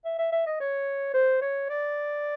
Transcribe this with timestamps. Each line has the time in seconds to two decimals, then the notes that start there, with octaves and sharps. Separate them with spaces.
0.05 E5
0.18 E5
0.32 E5
0.46 D#5
0.60 C#5
1.14 C5
1.41 C#5
1.69 D5